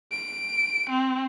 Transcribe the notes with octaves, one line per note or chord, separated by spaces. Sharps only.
D7
C4